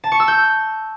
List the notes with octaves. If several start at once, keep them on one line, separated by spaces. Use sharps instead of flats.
A5
C#6
E6
G6